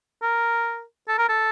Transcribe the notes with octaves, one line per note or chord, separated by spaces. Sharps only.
A#4
A4
A#4
A4